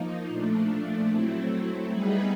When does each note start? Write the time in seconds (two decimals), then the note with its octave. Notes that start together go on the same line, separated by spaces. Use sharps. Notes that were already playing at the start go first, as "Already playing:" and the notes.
Already playing: F3 A#3 D#4
0.28 A#2 F3 A3 D4
1.09 F#3 A3 C4 E4
1.90 G3 B3 D#4 G#4 B4